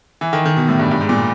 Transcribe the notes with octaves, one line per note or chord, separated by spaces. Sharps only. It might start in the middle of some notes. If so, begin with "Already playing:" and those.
E3
D#3
D#3
B2
A2
G2
G2
G#2
A#2